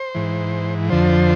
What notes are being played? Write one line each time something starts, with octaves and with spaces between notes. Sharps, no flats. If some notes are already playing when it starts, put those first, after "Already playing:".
Already playing: C5
G#2 E3
F2 D3 F3 C5